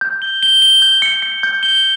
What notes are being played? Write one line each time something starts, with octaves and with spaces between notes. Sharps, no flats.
G6
G7
G7
G7
G6
C#7
C#7
G6
G7